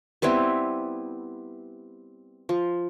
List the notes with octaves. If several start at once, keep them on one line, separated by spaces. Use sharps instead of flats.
G3 B3 C4 E4
F3